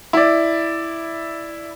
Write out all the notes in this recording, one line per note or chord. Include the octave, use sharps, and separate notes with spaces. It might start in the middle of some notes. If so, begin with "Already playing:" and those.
E4 D5